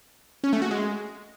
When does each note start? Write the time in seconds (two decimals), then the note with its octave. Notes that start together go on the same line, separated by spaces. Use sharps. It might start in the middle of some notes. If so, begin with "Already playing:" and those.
0.44 C#4
0.53 A3
0.62 F#4
0.71 G#3